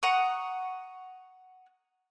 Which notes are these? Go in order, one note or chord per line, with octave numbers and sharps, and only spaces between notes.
F#5 A#5 C#6 D#6